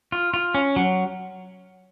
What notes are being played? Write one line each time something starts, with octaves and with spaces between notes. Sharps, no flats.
F4
F4
C#4
F#3